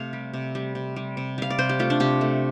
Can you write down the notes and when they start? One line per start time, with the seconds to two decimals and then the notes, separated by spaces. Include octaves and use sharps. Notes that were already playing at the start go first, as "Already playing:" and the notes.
Already playing: C3 A3 F5
0.13 G3
0.34 C3
0.55 G3
0.75 C3
0.96 G3
1.17 C3
1.38 G3 F5
1.50 D5
1.58 C3 C5
1.69 G4
1.79 A3 F4
1.90 D4
2.00 C3 G4
2.21 A3